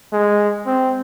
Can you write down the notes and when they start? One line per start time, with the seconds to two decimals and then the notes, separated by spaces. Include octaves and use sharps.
0.12 G#3
0.66 C4